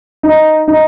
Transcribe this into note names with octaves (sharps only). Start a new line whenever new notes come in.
D#4
D#4